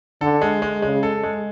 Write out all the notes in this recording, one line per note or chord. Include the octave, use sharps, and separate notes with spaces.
D3 A4
G#3
G#3
C#3 G#3
A4
G#3